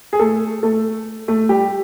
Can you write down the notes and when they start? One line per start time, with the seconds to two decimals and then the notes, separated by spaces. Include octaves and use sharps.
0.13 G#4
0.19 A3 A4
0.63 A3 A4
1.28 A3 A4
1.49 G3 G4